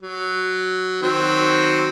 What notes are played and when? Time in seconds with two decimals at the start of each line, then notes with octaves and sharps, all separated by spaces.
0.02 F#3
1.02 D#3 F#3 C4